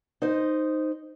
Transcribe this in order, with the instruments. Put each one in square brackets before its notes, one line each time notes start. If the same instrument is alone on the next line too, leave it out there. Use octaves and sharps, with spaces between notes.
[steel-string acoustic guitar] D#4 C5 D#5